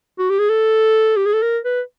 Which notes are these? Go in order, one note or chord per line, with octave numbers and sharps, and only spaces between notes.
F#4
G4
G#4
A4
G4
G#4
A4
A#4
B4